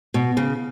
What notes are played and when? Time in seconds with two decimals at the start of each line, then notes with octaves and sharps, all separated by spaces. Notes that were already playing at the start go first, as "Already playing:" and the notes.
0.14 B2
0.37 C#3